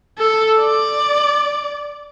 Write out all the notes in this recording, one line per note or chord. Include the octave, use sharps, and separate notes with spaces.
A4
D5